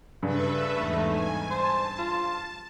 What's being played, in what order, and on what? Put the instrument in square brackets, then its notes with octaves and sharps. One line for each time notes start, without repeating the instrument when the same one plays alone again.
[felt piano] G2 C#3 [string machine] A4 B4 E5
[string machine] E2 G#2 D#4 [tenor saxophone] A3
[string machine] G#5
[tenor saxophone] C5 [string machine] A5
[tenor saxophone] F4